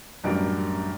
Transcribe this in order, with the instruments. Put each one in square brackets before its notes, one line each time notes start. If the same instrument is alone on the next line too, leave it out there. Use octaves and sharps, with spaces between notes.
[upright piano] A1 F#2 G3 D4 A#4 D7